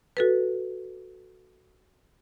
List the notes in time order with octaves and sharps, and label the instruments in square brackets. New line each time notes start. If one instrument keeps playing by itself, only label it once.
[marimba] F#4 A4 B4